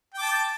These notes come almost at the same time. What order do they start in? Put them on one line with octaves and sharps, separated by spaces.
G5 D6 A5